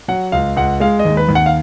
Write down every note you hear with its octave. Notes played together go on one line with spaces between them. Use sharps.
F#3 F#5
C#2 F5
C#2 F#5
G#3 F5
D#5
D#2
B4
D#2
F#5
F5